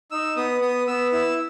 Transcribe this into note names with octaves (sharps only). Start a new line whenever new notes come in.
D#4 E6
B3 D#6
B3 D#6
B3 E6
E4 E6